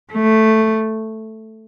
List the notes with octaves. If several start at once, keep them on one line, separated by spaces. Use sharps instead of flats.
A3